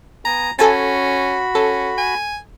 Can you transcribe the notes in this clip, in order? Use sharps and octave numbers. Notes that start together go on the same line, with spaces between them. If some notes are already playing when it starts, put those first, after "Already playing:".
B3 G#5 A#5
C#4 F#4 A4 G#5 A5 B5
C#4 A4
G#5